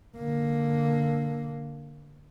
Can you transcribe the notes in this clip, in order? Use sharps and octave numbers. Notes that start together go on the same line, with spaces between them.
D3 A#3